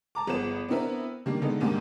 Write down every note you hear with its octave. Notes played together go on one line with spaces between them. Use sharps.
A5 A#5 D6
G1 F3 B3 G#4 B4 E7
B3 C4 D4 E4 A#4 B4
D#3 G3 A#3 D4
D3 D#3 G#3 B3 D#4 A4
D#2 G#2 D#3 G3 D4